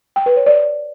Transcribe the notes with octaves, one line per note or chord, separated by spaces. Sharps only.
G5
B4
C#5
D5